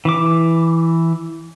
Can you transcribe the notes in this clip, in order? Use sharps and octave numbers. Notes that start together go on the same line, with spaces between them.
E3 D6